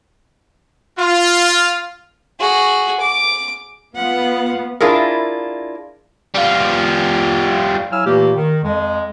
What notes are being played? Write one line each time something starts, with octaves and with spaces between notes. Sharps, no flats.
F4
F#4 G#4
D6
B3 F4 F5 F#5
D4 E4 F4 G#4 A#4
G3 F4
F#3 E4 F5 G#5 E6 F6
A#2 E3 A3 A#3 G4
D#3
F2 G#3